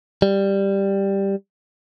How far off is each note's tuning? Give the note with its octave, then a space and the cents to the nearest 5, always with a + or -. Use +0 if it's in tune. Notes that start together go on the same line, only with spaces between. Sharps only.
G3 +5